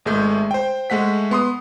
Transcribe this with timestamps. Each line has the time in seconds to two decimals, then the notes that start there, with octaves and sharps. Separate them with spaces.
0.05 G#1 G#3 A3 G6
0.51 C5 G5
0.90 G#3 A3 F#5 B6
1.31 B3 C6 D#6